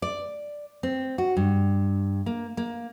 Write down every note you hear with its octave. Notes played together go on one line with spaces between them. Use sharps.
D5
C4
F#4
G2
A#3
A#3